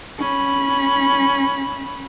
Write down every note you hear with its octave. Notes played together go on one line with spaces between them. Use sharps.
C#4 B5